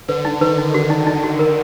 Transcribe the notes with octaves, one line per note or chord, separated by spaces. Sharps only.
D3 B4
D#4
D#3 B4
D#4
D3 F#4
D#4
D#4
F#4
A#4